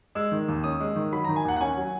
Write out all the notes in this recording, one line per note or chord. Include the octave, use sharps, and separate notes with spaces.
G#3 E6
D#3
D#2
C#4 D#6
G#3
D#3
F#3 B5
D#3 A#5
G#5
D#2 F#5
F#5
C#4 G#5
F#3